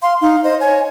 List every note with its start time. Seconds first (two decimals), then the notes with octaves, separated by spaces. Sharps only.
0.02 F5 C6
0.21 D#4 F5
0.44 C5 D#5
0.61 C#5 G#5